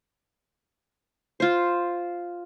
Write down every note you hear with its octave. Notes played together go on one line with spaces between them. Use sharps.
F4 C5